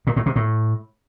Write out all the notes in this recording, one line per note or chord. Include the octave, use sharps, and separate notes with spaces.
A#2
A2
C3
A2